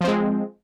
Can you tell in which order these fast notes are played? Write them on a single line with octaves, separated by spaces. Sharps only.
F3 C4 G#3